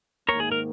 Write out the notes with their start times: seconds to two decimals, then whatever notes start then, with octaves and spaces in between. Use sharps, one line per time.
0.29 G#2 D#3 A#3 A#4 C#5
0.40 G#4
0.52 A#4